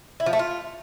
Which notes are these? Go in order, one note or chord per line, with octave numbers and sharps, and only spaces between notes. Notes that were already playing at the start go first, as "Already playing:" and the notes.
E4
F3
A3
F4